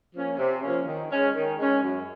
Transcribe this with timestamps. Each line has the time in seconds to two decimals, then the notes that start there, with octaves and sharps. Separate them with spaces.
0.14 F3 A#3 C#4
0.38 C3
0.63 F3 A#3 C#4
0.86 D#3
1.10 G#3 C#4
1.34 D#3
1.59 G#3 C#4
1.83 F#2